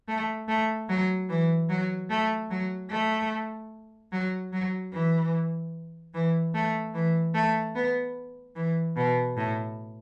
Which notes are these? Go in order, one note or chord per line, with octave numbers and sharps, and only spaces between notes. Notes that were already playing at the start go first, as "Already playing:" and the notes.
A3
A3
F#3
E3
F#3
A3
F#3
A3
F#3
F#3
E3
E3
A3
E3
A3
B3
E3
B2
A2